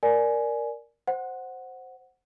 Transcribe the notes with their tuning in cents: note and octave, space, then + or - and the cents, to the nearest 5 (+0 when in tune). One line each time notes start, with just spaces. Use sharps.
A#4 +0 D5 +0 G#5 +10
C5 +0 F#5 +0